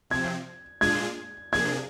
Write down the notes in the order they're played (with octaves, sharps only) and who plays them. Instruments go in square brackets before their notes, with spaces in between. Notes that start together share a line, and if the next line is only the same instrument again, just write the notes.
[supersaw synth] C3 F3 C4 [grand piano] G#6
[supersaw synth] A#2 G#3 D4 F4 G#4 [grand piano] G#6
[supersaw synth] C3 F3 A#3 D4 G#4 [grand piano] G#6